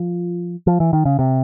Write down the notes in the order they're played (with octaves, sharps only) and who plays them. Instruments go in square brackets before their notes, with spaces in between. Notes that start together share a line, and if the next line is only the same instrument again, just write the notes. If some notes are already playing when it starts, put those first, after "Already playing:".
Already playing: [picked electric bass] F3
F3
E3
D#3
C#3
C3